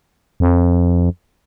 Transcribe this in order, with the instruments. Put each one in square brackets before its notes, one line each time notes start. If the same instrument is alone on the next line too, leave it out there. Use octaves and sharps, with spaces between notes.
[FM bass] F2